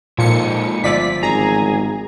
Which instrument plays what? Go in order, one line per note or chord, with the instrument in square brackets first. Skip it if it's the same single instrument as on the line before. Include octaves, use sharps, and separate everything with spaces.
[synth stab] A#2 C#7 [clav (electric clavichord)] F3 [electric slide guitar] G#3 D#4 A4
[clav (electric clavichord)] G1 F3 E5 [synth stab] D5 B6
[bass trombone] G#1 [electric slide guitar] G#4 [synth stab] A#5